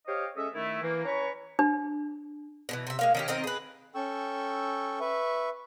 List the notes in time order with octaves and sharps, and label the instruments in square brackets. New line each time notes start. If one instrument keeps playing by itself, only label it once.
[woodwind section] G4 C5 C#5 D#5 F5 G5
G#3 C#4 A4 D#5 E5
D#3 A3 E4
E3 A#3
C#4 B4 C#5 A#5 B5 C#6
[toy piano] D4
[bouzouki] B2 D3 E3
C3 E5
G#3 A#3 F5
D#3 C#4 G4
D#3 C4 A#4 D#5
G#4 B4
[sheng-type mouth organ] C#4 A4 G5 C#6 E6
B4 E5 C#6